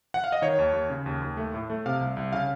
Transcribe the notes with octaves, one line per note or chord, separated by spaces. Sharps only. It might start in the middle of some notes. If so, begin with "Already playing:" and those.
F#5
F5
D#5
D#3 C#5
D#2
D#2
C#3
D#2
D#2
A3
A2
A3
C3 F5
C2
C2
C#3 F5